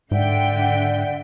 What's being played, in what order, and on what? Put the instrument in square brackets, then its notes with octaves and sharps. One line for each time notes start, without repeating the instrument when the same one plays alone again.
[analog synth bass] G#2 [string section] D3 G5 [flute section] D5 E5 F#5